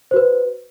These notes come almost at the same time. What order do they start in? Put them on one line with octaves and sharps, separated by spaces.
C5 F#4 B4